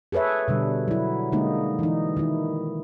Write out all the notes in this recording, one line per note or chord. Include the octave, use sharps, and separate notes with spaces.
G#4 A4 B4 C#5 E5
B2 D3 G3
F#3 E4
D3 G#3 A#3 D#4
E3 D#4
D#3 E4